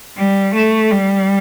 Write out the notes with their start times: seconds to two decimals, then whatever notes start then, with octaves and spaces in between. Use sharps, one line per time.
0.17 G3
0.54 A3
0.90 G3